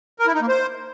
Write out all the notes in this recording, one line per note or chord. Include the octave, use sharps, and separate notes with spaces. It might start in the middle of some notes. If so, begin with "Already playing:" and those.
A#4
E4
D#4
A#3
C5